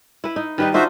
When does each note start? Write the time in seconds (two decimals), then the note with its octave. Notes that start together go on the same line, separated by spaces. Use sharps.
0.24 E4 B4
0.36 D#4
0.58 D#3 G3 D#4 B4
0.74 D4 D#4 F4 F#4 C5 E5